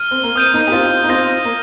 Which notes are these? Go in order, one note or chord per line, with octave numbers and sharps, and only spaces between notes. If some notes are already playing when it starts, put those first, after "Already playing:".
Already playing: F6 D#7 G7
C4
A#3
C4 D#6 G6 D#7
A#3 D#4
G4
C4 F4
D#4
C4 F4 D#6 G6 A#6
A#3